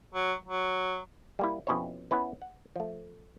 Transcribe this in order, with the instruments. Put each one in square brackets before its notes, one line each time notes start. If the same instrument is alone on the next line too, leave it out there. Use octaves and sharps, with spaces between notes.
[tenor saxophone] F#3
F#3
[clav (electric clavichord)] G3 A#3 E4
F2 B2 C#4 E4 C5 C#5
B3 C#4 E4 B4
F#5
F3 A3